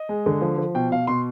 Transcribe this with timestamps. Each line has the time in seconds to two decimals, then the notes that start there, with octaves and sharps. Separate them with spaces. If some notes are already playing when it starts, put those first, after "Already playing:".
Already playing: D#5
0.09 G#3
0.26 D3
0.41 F3
0.58 F3
0.74 B2 G5
0.91 B2 F5
1.07 B2 C6